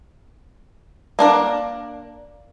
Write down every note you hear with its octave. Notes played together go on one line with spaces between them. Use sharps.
A#3 D4 A#4